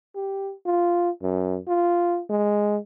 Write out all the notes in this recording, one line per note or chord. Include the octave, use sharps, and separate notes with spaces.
G4
F4
F#2
F4
G#3